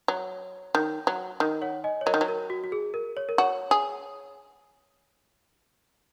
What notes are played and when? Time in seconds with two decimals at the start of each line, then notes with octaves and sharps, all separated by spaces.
0.08 F#3 C#5
0.75 D#3
1.07 F#3
1.40 D#3 A#4 D#5
1.62 C#5 F#5
1.84 D#5 G#5
2.01 C#5
2.06 F#3 A#4 D#5
2.14 D#3
2.21 F#3
2.28 A#4
2.50 F#4
2.64 F#4
2.72 G#4
2.94 A#4
3.17 C#5
3.29 A#4
3.38 F#4 C#5
3.71 G#4